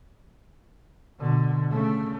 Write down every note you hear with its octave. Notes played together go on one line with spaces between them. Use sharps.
B2 D3
C#3 A3